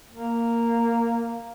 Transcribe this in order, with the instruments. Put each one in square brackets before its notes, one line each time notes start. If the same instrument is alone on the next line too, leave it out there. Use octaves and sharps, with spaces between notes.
[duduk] A#3